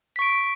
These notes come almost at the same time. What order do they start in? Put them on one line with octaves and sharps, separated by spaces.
B6 C#6 D7